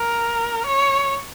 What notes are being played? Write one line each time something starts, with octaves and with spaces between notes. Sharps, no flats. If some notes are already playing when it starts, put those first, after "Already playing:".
Already playing: A#4
C#5